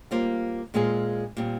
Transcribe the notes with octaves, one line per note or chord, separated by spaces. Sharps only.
G3 A#3 F4 C5
A#2 G#3 C4 F4 G#4
A#2 G3 C4